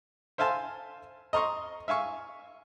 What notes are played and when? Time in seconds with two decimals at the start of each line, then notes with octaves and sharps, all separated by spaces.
0.38 C5 E5 F5 G#5 A5 C6
1.33 D#5 A#5 C6 C#6
1.88 E5 F5 G#5 C#6